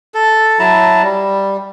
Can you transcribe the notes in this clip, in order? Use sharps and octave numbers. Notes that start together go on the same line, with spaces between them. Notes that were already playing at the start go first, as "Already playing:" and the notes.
A4
F#3 E4 A5 A#5
G3